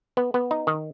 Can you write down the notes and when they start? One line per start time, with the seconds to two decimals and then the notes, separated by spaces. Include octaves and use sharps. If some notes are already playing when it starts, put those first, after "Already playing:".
0.17 B3
0.34 B3
0.51 D#4
0.67 D#3